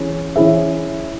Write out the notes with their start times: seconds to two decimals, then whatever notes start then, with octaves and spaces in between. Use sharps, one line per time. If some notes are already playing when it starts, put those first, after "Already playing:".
Already playing: E3 C#4 E4 G#4
0.36 E3 C#4 E4 G#4 E5